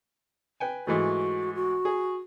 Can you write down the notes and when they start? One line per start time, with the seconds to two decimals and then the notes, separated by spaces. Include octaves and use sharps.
0.60 B4 G5 G#5
0.87 G#2 E3 A3 F#4
1.55 F#4
1.85 G#4